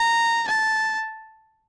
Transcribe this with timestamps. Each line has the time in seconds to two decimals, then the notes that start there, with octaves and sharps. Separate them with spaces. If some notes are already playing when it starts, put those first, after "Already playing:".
Already playing: A#5
0.48 A5